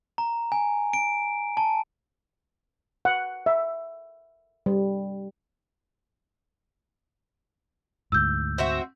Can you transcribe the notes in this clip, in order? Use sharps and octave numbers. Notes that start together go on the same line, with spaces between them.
A#5
G#5
D7
A5
F#5
E5
G3
D2 G#2 E6 G6
C4 F#4 E5